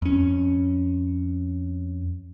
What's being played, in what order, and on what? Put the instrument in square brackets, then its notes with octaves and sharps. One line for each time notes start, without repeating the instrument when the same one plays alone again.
[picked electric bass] F2 C#4